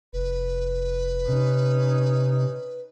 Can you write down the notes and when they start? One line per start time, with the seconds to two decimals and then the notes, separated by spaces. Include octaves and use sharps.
0.13 F1 B4
1.28 C3 C#4 D#4